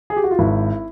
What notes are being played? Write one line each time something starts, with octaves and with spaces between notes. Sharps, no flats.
G#4
G4
F#4
F4
G#1 E4